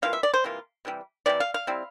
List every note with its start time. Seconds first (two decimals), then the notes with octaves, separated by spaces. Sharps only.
0.02 C3 E3 A#3 F4 F5
0.13 E5
0.23 D5
0.34 C5
0.44 C3 E3 A#3 F4
0.85 C3 E3 G3
1.26 C3 E3 G3 D5
1.40 F5
1.54 F5
1.67 G3 C4 E4